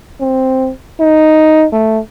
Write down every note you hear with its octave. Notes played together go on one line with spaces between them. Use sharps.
C4
D#4
A3